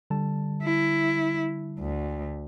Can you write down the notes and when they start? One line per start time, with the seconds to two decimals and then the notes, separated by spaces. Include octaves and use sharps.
0.10 D3 G3 A5
0.63 E4
1.79 D2